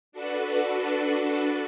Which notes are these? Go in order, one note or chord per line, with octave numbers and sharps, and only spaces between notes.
D4 F#4 A4 B4